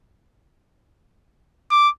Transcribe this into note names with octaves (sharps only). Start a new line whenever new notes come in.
D6